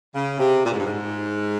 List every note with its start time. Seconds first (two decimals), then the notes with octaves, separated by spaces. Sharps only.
0.14 C#3
0.39 C3
0.64 A#2
0.72 G#2
0.78 G2
0.86 G#2